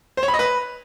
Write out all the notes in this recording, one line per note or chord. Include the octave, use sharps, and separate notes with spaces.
C5
C#5
B5
D#5
B4